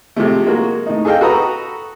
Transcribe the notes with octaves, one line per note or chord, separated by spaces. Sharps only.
C3 F3 G#3 A3
G#3 A#3 F#4
A2 D#4
G#4 A4 D#5 F5 G5
F#4 A4 B4 A#5 D#6